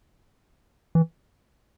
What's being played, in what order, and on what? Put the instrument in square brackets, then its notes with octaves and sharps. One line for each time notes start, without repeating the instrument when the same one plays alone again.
[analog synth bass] E3